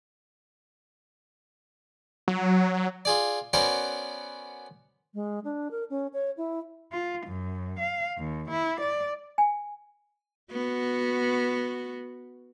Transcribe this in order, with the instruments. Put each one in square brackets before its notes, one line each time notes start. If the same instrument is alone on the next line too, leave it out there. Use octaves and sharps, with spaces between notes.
[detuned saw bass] F#3
[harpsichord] F4 G#4 D5
B3 C#4 F#4 A#4 C5 D5
[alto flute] G#3
D4
A#4
C#4
C#5
E4
[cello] F4
F#2
F5
D#2
E4
D5
[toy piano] G#5
[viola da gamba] B3 F#4